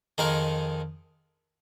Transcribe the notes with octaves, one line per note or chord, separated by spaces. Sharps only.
F2 D#3 G#3 D#4 A#4